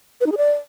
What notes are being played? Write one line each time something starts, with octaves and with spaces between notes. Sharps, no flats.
B4
D#4
G#4
D5